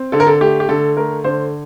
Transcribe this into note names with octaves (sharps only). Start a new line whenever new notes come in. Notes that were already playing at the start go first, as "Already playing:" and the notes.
Already playing: C4
D3 A4
A#4
A4
A3 G4
G4
D3 A4
A3 A#4
D3 C5